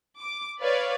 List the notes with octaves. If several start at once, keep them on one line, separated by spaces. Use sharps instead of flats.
D6
B4 C#5 D5 F5